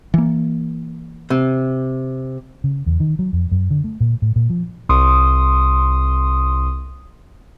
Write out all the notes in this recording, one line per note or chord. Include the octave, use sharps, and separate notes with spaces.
E3 A#3
C3
C#3
E2
D#3
F#3
F2
F#2
D3
A3
A#2
A2
A#2
F3
C2 C6 D#6